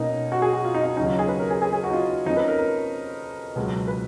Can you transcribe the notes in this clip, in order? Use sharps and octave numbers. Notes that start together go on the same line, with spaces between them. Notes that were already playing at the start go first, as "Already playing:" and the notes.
Already playing: B2 A#3 C#4 D#4
F#4
G#4
F#4
F4
D#4
F4
D#4
D#2 C#3 F#3 C#4 D#4
F4
G#4
B4
A#4
G#4
G#4
G#4
F#4
D#4
F4
F2 F3 A#3 C#4 D#4
B4
A#4
A#4
C#2 B2 F#3 B3
B4